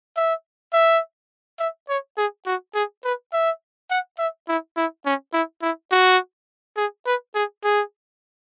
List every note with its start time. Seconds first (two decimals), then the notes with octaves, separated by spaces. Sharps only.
0.16 E5
0.73 E5
1.59 E5
1.89 C#5
2.17 G#4
2.46 F#4
2.74 G#4
3.04 B4
3.33 E5
3.90 F#5
4.18 E5
4.48 E4
4.77 E4
5.05 C#4
5.33 E4
5.62 E4
5.91 F#4
6.77 G#4
7.06 B4
7.35 G#4
7.64 G#4